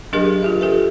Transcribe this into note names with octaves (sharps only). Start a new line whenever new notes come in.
F#3 D4 G4 G#4 A#4 D#5
F4 G4 E5
G4 A4 B4